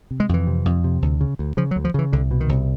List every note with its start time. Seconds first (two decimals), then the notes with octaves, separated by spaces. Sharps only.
0.11 C3
0.20 G#3
0.29 F2 E3
0.47 C3
0.65 F2
0.84 C3
1.02 D2
1.21 C#3
1.39 D2
1.57 C#3 F3
1.71 F#3
1.76 D2
1.85 F3
1.94 C#3 E3
2.13 C2 D3
2.31 B2
2.40 D#3
2.49 C2